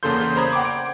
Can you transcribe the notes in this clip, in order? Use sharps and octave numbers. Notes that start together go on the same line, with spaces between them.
E2 C#3 A#3 A4 C6 G6
C5 D5 A#5 B5 D#6 G#6
F#5 G5 C6 D6
D7